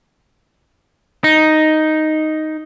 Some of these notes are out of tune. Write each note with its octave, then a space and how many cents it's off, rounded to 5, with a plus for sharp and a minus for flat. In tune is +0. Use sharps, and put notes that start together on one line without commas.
D#4 +0